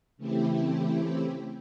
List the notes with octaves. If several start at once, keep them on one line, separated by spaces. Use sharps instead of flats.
C#3 E3 A3 C4 E4 G4